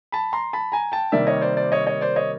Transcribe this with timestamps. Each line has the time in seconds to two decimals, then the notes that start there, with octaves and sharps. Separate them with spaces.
0.12 A5 B5
0.33 A#5 C6
0.53 A5 B5
0.72 G#5 A#5
0.92 G5 A5
1.12 C3 D#3 G3 A#3 D#4 D5 E5
1.27 C#5 D#5
1.42 C5 D5
1.57 C5 D5
1.72 C#5 D#5
1.87 C#5 D#5
2.01 C5 D5
2.16 C#5 D#5